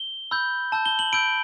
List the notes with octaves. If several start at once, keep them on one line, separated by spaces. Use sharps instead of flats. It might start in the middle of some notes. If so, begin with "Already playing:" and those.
Already playing: G7
B5 E6 G6
A5 E6 G6
G7
F#7
B5 E6 G6 D7